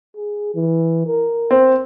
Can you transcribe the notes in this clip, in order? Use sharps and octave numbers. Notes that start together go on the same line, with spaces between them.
G#4
E3
A#4
C4